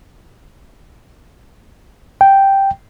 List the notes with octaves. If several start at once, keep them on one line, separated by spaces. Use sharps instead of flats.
G5